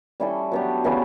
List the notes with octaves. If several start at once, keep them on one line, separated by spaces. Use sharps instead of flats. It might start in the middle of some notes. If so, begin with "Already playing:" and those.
G3 C#4 E4 A4
F#3 B3 D4 G4
C#3 E3 B3 E4